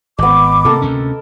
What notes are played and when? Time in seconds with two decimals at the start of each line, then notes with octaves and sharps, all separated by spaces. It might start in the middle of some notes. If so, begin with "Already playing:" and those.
0.19 G#1 B3 D#5 D6
0.65 C3 A#3 A4 A#4
0.82 D2 C3 C#4